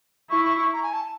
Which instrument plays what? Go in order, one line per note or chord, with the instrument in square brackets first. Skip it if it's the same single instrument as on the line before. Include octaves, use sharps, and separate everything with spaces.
[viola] E4 [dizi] C#6
[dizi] C#6
C#6
A#5
G#5
A5